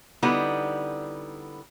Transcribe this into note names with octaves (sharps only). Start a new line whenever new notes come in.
D3 G3 B3 D#4 E4